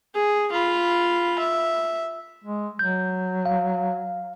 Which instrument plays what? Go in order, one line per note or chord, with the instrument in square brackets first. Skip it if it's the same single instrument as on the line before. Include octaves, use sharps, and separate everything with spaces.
[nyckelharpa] G#4
F4 B5
E5
[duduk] G#3
[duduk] F#3 [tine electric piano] G6
[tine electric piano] F5